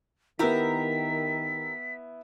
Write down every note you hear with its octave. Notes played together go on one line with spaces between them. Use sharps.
D#3 B3 E4 G4 A#4 E5 B6